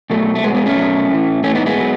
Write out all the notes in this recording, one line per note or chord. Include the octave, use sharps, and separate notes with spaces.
B2 F#3 A3
A3
B2 F#3 G#3 B3
G#3 B3
A3 C#4
B2 F#3
A2 E3
A2 E3 A3 C#4
B3 D#4
G#3 B3
B2 F#3